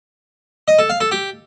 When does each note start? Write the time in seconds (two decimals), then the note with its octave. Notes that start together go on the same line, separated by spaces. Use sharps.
0.68 D#5
0.79 A4
0.90 F5
1.01 A4
1.11 G4